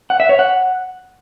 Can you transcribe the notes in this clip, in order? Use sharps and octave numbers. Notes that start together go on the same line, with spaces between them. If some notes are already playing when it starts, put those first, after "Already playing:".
F#5
E5
C#5
F#5